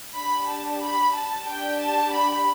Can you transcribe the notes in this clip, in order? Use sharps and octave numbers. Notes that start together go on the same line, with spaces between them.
D4 G4 B5
A5
B5
A5
D4 G4 G5
A5
B5